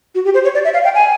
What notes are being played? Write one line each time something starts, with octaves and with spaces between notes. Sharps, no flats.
F#4
G4
C5
C#5
D5
E5
F5
G5
G#5